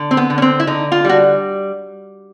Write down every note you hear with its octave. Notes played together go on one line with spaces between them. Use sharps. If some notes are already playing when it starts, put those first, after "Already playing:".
Already playing: D3
C4
B3
D3
C#4
C4
E4
D3 D#4
F4
G3 F#4